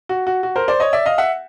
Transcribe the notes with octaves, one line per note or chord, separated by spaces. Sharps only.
F#4
F#4
F#4
A#4 C5
C5 D5
C#5 D#5
D5 E5
D#5 F5
E5 F#5